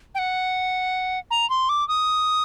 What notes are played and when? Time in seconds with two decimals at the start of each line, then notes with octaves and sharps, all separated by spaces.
0.15 G5
0.19 F#5
1.31 A#5
1.50 C6
1.69 D6
1.88 D#6